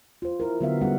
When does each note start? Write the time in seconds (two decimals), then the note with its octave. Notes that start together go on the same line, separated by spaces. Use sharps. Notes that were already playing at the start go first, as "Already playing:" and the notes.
0.22 F4 C5
0.40 E4 A#4
0.61 D3 F#3 B3 F#4 E5 F5
0.81 G3 G#3 B3 C#4 F#5